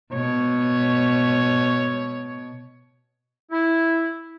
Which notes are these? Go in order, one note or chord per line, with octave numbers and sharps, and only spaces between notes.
B2 C#5
E4